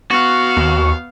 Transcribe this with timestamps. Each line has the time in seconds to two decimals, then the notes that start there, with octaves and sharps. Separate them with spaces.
0.11 B3 F#4 F5
0.57 D#2